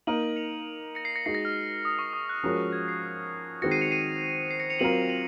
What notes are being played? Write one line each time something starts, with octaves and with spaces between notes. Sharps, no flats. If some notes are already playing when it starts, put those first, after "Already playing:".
A#3 D#4 A#4 D#7 F#7
C#7 F7
A#6 C#7
C7
A#6 C#7
G#3 D#4 F#4 C7
A#6
F6
D#6
C#6
D#6
F#6
F3 G#3 C#4 F#4 A#4
G#6
C7
C7
D#3 G#3 C4 F#4 A#6 C#7
C7 D#7
C#7 F7
C7 D#7
C7
A#6 C#7
C#7 F7
F#3 C4 F4 A#4 D#7 F#7
D#7 F#7